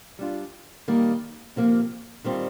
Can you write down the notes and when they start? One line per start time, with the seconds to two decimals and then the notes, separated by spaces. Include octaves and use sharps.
0.19 G3 D4 F4
0.88 D#3 G3 A#3
1.56 C3 F3 A#3
2.24 D#3 G3 C4 F4